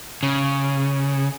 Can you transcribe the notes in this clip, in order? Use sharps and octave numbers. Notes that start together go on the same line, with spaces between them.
C#3